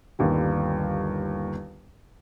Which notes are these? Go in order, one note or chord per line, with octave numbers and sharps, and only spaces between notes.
G1 D#2 D3 G3